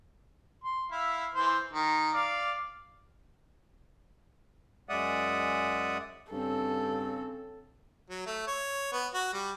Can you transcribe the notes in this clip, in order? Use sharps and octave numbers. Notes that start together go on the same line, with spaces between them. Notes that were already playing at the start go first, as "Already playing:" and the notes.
C6
E4 E5 F5
E3 C5 C6
D#3
D5 F5
F#2 G#3 D5 E5 F#5 D#6
G2 C#3 C4 A4
F#3
A3
C#5
B3
F#4
G3